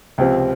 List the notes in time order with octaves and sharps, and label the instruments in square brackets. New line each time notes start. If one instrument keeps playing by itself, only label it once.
[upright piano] C#2 C3 F3 C4